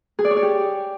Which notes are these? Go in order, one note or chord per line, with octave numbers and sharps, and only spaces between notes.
G#4
D5
C#5
D5
G4